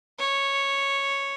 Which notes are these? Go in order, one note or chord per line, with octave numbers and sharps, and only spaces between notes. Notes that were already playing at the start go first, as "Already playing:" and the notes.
C#5